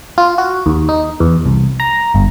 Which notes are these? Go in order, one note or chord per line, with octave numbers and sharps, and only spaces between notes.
F4
F#4
D#2
D#4
E2
C2
A#5
G1